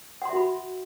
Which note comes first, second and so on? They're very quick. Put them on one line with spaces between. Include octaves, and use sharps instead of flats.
F#5 C6 E5 F#4 B5